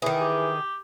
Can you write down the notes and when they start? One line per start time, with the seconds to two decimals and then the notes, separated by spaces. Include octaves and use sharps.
0.02 D#3 E3 G#4
0.21 G4